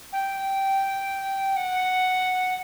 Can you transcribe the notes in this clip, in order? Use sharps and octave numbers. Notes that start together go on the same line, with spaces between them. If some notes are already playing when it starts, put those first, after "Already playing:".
G5
F#5